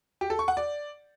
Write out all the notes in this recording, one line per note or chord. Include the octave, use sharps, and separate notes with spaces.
G4
A4
C#6
F#5
D5